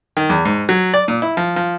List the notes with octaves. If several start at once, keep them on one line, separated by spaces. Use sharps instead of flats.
D#3
E2
G#2
F#3
D5
A#2
E4
F3
F3